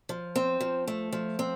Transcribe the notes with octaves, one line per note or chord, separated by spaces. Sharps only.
F3
C4
F3
A3
F3
C4